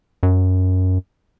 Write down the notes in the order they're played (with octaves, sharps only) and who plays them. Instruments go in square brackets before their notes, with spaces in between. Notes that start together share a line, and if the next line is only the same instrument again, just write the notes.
[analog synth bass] F#2